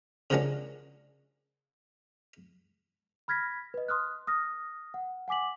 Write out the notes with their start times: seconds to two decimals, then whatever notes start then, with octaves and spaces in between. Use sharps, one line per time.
0.30 C#3 F3 F#3 A#3 C#4 D4
3.28 B5 F6 G#6 A#6 B6
3.74 B4 D#5
3.88 C6 D#6 F6 F#6
4.27 D#6 F6 A#6
4.94 F#5
5.28 F#5 G#5 D6 B6 F#7